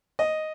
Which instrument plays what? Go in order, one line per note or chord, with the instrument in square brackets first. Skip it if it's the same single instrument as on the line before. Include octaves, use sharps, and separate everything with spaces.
[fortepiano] D#5